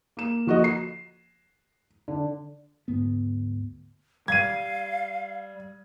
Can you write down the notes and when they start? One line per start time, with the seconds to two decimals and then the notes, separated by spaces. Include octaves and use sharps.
0.17 A#3 E7
0.47 F3 A#3 F#4 A4 D#5
0.64 C7
2.08 D3
2.88 D2 G#2 B3
4.28 G3 F5 G#6 D#7